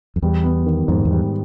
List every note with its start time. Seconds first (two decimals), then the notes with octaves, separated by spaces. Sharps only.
0.16 F2
0.22 E2 G3
0.44 B3
0.66 D#3
0.88 F2 G#2
1.05 E2
1.11 G3